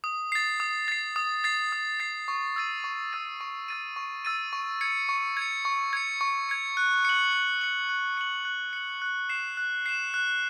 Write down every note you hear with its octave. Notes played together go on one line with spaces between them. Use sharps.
D#6
A6 C7
D#6
A6 C7
D#6
A6 C7
D#6
A6 C7
C#6
E6 A6 D#7
C#6
E6 A6 D#7
C#6
E6 A6 D#7
C#6
E6 A6 D#7
C#6
G#6 C#7
C#6
G#6 C#7
C#6
G#6 C#7
C#6
G#6 C#7
F#6
C#7 F#7
F#6
C#7 F#7
F#6
C#7 F#7
F#6
C#7 F#7
F#6
C7 E7
F#6
C7 E7
F#6